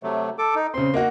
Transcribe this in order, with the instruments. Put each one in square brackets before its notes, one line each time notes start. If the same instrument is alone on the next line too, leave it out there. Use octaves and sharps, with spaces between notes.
[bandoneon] C3 F#3 A3
A4 D6
D#4
[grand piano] C#3 C4 [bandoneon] C6
[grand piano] A#3 D#4 F#4